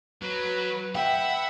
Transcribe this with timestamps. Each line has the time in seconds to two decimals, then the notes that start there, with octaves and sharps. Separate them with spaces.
0.22 F#3 B4
0.95 E5 F#5 G5 B5